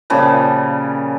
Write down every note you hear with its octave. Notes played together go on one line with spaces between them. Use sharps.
A#2 C#3 F3 G3